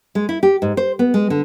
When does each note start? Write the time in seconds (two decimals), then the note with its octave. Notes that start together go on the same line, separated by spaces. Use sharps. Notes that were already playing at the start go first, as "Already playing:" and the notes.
0.15 G#3
0.29 E4
0.43 G4
0.62 G#2
0.77 C5
0.99 B3
1.14 G#3
1.30 D3